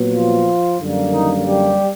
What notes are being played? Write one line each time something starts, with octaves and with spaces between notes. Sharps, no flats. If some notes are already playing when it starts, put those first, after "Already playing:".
Already playing: A#2 F#3 B3
F3 F4
F#2 D3 G3 A#3
D#3 D#4
G3 G4